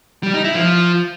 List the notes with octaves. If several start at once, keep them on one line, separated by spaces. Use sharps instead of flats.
G3
D#4
E4
F3